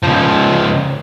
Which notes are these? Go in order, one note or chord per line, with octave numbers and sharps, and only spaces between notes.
C#2 F3